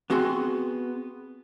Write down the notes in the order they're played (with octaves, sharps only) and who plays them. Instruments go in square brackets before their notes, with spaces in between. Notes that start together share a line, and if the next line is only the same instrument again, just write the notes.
[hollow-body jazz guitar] B3 C4 F#4 G#4 C6